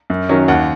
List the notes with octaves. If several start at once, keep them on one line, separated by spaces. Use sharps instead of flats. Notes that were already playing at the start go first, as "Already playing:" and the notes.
F#2
D#3 F#3 C#4
D#2 F#5